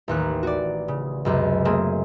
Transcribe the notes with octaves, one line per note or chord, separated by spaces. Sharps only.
A1 D#2 F#6
F#4 D5
C#3
C#2 F#2 C3
A3 A#3 C4 G#4